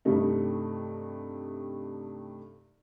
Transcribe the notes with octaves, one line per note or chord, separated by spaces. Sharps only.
G2 C3 A3 D#4